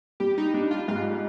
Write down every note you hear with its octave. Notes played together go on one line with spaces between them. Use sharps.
G3 G4
D#4
G3 D4
F4
G#2 F4